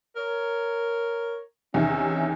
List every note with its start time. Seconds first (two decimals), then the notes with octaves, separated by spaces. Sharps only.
0.16 A#4 C#5
1.74 E2 C3 D#3 C#4 E5